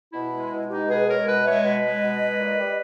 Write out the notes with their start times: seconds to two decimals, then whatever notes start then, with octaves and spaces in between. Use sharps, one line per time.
0.12 B2 E4
0.32 G#3
0.50 B2
0.69 G#3 D#4 G4
0.88 B2 G#4 B4
1.07 G#3 A#4 C#5
1.26 B2 B4 D#5
1.45 G#3 C#5 E5
1.64 B2 B4 D#5
1.83 G#3
2.02 B2
2.20 G#3
2.39 A#2
2.58 G3